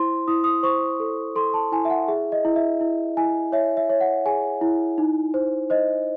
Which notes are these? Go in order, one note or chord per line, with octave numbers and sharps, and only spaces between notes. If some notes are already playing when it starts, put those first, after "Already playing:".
Already playing: E4 C5 C6
E4 D#6
D#6
C5 C#6
A4
A4 C6
A5
E4 G#5
E5
F#5
G#4 E5
D#5
E4
E5
E4
E4 G#5
C#5 E5
E5
C#5
F#5
G#4 G#5
E4
D#4
C5
C5 D#5